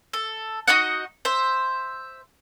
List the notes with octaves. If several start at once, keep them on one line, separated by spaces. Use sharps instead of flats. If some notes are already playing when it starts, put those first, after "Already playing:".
A4
D#4 F#4 D#5 F#5
C5 E5